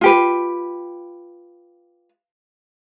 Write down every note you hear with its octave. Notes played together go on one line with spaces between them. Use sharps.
F4 G4 B4